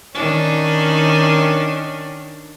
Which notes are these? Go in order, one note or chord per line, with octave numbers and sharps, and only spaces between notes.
D#3 C#4 D4